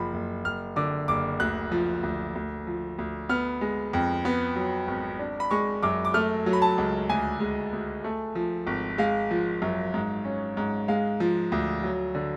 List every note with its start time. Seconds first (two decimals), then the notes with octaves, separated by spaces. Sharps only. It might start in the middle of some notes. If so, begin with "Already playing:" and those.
Already playing: F#1 F3 B5
0.14 F#1
0.45 F#1 F6
0.76 D3 D6
1.08 F#1 D6
1.40 D2 F#6
1.72 F3
2.03 D2
2.35 D2
2.67 F3
2.98 D2
3.29 B3 F6
3.61 G#3
3.93 F2
4.25 B3
4.56 F#3
4.88 G#1
5.19 D4
5.40 B5
5.51 G#3 C#6
5.82 F#2 D6
6.05 D6
6.14 A3 F6
6.46 F#3
6.53 B5
6.62 A5
6.78 C#2
7.09 D2 G#5
7.40 G#3
7.73 D2
8.04 A3
8.35 F3
8.67 G#1
8.98 G#3 F5
9.31 F3
9.62 F#2
9.94 G#2
10.25 C#4
10.57 G#2
10.88 G#3 F5
11.20 F3
11.52 D2
11.83 F#3
12.15 D3